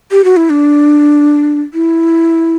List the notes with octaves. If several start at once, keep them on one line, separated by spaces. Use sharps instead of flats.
G4
F#4
E4
D4
E4